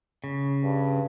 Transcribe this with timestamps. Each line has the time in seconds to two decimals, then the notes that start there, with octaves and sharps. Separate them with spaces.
0.24 C#3
0.63 G2